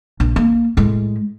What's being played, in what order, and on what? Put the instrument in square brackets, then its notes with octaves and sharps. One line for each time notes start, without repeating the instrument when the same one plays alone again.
[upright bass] A#1
A#3
A2 G#3